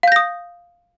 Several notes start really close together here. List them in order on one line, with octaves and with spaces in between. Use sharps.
F5 G6 A#6 D#6